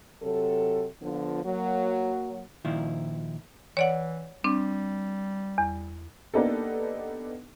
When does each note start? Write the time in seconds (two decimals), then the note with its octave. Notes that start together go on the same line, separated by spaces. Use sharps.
0.22 C3 F#3 A4
1.02 D3 F3 B3 F4
1.44 F#3 A#3
2.65 A#2 D#3 F3 E4
3.77 E3 C#5 D5 F#5
4.44 G3 C4 D4
5.58 E2
6.34 A#3 B3 D4 D#4 G4 A4